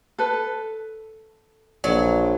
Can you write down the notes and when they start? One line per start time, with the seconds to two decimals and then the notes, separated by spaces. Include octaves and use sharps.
0.18 A4 B4
1.84 A#1 F#3